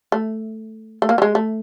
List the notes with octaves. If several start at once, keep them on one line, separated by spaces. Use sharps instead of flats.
A3
A3
A#3
G3
G#3
A3